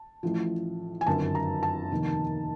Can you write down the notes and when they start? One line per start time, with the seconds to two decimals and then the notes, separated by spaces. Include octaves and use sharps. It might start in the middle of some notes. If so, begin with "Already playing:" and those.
Already playing: A5
0.23 A1 A2 F3
1.01 G#5
1.06 G1 F#2 D#3 A5
1.35 A#5
1.63 A5
1.91 F1 D#2 D#3